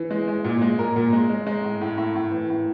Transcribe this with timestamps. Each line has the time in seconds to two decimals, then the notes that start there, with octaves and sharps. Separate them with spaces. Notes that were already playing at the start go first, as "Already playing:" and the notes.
Already playing: E3
0.11 G#3
0.28 G#3
0.45 A#2
0.62 G#3
0.79 A#2 A#4
0.96 A#2
1.13 G#3
1.30 G#3
1.47 G#3
1.64 A2
1.81 A2
1.98 A2
2.16 A2
2.32 E3
2.50 A2